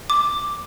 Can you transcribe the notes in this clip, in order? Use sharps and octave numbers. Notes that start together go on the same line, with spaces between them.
D6